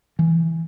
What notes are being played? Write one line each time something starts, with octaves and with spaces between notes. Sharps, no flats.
E3